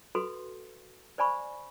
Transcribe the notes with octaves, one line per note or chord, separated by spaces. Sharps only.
F#4 A4 B4 C6
C5 D5 G#5 B5 C#6